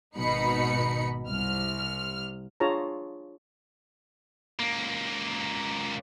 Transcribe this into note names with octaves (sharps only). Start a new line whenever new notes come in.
G#1 B2 D#4 B5 C#7
C2 F6
D4 F4 G#4 C#5 A5 A#5
C#2 A#3